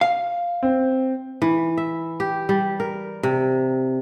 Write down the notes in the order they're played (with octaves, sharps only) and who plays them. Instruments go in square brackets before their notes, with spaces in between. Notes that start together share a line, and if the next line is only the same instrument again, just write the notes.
[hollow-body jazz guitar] F5
[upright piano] C4
[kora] E3
E5
G4
G3
A#4
C3